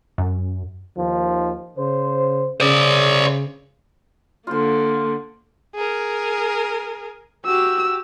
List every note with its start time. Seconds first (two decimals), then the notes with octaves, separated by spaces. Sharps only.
0.18 F#2
0.96 D#2 D#3 F3
1.77 C#3 C5
2.60 C#3 C5 D5
4.47 D3 A#3 F4 C5
5.75 G#4 A#4
7.46 F#4 G4 E6